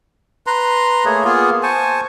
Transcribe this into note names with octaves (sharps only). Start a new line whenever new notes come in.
B4 A#5 C6
A3 A#3 G#4 C#5
A#3 B3 F4 G#4
C5 G#5 A5 C#6